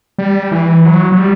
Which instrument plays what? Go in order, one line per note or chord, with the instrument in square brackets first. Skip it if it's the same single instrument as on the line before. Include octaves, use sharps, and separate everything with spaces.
[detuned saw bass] G3
E3
F#3
F#3
G3